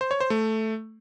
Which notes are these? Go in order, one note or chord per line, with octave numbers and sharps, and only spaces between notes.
C5
C#5
C5
A3